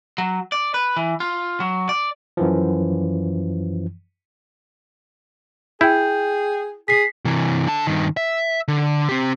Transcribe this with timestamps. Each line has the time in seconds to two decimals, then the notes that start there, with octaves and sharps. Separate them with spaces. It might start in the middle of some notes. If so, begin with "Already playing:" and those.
0.18 F#3
0.52 D5
0.74 B4
0.97 E3
1.20 F4
1.60 F#3
1.89 D5
2.37 F#2 E3 F3
5.81 E4 G#4 G5 G6
6.88 G#4 B6 C7
7.25 C3 E3
7.67 D3 A5
7.87 G2 D#3
8.17 E5
8.68 D3
9.09 C4 G4